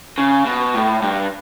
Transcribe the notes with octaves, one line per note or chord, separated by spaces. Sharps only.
C#3
B2
A2
G2